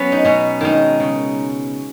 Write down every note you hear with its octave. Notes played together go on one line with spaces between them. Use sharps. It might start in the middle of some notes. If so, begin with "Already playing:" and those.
Already playing: F#3 B3 C#4
D#4
B2 C#4
D#3 G#3 D#4
C#3